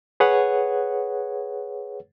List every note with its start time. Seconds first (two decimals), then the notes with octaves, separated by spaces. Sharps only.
0.20 G#4 B4 C#5 F#5